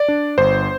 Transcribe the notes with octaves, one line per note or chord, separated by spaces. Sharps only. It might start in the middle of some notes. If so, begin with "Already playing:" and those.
Already playing: D5
D4
G1 C5